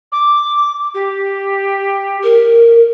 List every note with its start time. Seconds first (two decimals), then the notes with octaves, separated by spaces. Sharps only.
0.12 D6
0.94 G4
2.24 A#4